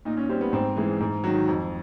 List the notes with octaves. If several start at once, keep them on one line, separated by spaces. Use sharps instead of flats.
A#2 D#4
C#4
G3 C4
B3
G#2 C4
E3 G#3
G#2
D#3 F#3
F2